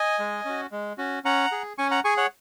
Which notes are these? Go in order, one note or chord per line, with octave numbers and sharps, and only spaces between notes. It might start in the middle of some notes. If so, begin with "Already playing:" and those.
Already playing: D#5 G#5
G#3
C#4 F#4
G#3
C#4 F#4
C#4 F#5 A#5
G#4
C#4 G#5 C#6
F#5 A#5
G#4 G#5 C#6
C#5 F#5